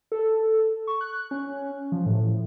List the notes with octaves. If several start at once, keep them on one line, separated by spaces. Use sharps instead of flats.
A4
C#6
F#6
C#4
F3
A2